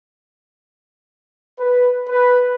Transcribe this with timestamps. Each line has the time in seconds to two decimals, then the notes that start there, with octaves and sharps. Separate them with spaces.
1.58 B4
2.08 B4